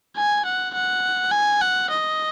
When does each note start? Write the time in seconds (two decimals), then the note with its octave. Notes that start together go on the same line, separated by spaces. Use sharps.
0.17 G#5
0.45 F#5
0.74 F#5
1.32 G#5
1.61 F#5
1.90 D#5